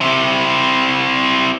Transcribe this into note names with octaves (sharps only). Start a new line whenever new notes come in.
C4 E4